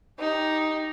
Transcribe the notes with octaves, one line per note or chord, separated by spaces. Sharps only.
D#4 G4